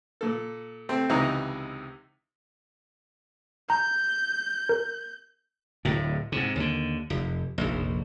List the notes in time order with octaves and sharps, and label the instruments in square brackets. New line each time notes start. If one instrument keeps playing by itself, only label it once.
[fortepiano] A#2 A4
A3 C4
C#2 C3 E3 D#4 B4 A#5
[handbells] A#5 [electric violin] G6
[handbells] A#4
[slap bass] D1 A2
G#2 C3
D#2 D3
F1
F1 A#1